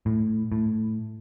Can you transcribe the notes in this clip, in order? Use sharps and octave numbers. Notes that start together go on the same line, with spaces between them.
A2
A2